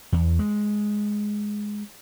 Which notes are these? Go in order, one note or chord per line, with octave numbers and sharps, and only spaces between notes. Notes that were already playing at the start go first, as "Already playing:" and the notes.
E2
G#3